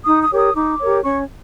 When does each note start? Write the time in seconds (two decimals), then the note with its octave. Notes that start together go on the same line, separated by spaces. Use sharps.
0.06 D#4 D#6
0.22 D#6
0.31 G4 A#4 C#5 D6
0.39 D#6
0.55 D#4 D6
0.80 G4 A#4 C#5
1.04 C#4 C#6